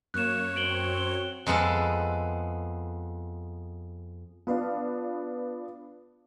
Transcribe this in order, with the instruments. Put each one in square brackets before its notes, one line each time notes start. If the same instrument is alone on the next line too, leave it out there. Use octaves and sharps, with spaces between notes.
[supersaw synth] F#2 C#5 [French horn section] A#3 [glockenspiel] F#6 E7
[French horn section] F#3 C4 [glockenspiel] D7 F#7 G7
[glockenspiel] G7
[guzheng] F2 G#3 B3 A4 A5
[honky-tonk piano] B3 D4 [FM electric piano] F4 B4 F5